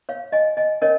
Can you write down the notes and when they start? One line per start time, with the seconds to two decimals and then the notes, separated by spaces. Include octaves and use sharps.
0.09 C#5 F5
0.32 D#5 G#5
0.57 D#5 G#5
0.82 C#4 A#4 C#5 D#5 G#5